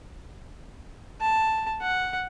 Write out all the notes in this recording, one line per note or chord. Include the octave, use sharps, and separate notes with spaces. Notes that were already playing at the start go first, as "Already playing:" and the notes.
A5
F#5